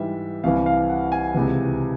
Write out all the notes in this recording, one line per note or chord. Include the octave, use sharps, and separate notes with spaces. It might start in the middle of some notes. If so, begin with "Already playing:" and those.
Already playing: G#2 E3 G3 E5
C2 C3 E3 F5
F5
F#5
G#5
C#2 C3 E3